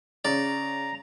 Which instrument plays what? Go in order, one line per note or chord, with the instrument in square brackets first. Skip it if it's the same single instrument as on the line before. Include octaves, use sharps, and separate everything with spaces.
[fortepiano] C#3 [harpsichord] D5 [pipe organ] A#5